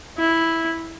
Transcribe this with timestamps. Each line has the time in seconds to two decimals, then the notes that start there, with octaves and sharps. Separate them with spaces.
0.18 E4